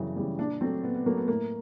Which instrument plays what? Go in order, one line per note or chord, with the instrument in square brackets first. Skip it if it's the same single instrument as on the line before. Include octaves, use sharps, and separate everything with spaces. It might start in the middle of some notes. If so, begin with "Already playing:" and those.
Already playing: [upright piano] F#2 C#3 E3 G3
C#3 E3 G3
A#2 D4
F#3 A3 C4
A#2 B3
B3
F#3 A3 A#3
B3
A2 A#3